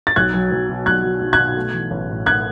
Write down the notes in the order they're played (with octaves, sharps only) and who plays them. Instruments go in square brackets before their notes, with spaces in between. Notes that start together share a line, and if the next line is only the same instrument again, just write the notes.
[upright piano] A6
[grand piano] B1 [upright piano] F#6 G#6
[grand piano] F#3
B1
B2
[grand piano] B1 [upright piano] F#6 G#6
[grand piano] F#3
B1
[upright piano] F#6 G#6
[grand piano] B2
A3
E3
A1
A2
[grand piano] A3 [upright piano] F#6 G#6